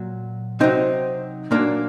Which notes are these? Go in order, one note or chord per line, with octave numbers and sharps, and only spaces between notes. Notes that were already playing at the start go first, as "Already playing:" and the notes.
Already playing: A#2 F#3
C3 F#3 C4 D#4
A#2 F#3 A#3 D4